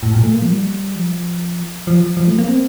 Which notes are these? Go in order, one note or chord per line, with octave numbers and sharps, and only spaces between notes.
A2
A#2
A3
A#3
F3
G3
F3
F3
F3
A3
A#3
C4